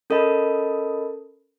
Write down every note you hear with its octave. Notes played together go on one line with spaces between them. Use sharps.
C#4 A4 A#4 D#5 B5